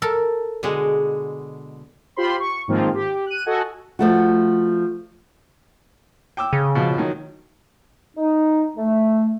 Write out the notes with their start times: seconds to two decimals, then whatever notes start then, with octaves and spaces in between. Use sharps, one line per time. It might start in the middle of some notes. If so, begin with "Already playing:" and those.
0.02 A4 A#4
0.63 B2 D3 G#3
2.16 F4 G4 C5 B5 C6
2.40 C#6
2.68 G#2 D#3 F3 A#3 C4 F4
2.94 G4
3.26 F#6 D#7
3.46 F#4 A4 D#5 F#5 G#5
3.99 F3 A3 F#4
6.37 G5 D6 E6
6.53 C#3
6.75 B2 F3
6.98 D#3 F#3
8.17 D#4
8.77 A3